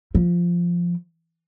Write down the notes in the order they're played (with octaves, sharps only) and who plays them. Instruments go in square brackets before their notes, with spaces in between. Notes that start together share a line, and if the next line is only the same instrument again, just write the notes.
[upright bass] F3